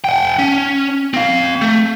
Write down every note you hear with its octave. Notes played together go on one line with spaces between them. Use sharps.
F#5 G5
C#4
C4 F5
A3